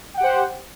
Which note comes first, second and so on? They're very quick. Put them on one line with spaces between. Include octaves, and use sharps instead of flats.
G5 F#5 G4 C5